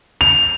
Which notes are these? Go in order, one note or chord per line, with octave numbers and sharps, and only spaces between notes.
F7